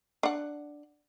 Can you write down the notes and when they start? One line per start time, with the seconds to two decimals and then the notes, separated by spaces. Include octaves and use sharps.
0.23 D4 F#5